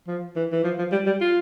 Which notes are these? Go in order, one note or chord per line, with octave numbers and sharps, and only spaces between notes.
F3
E3
E3
F3
F3
G3
G3
F4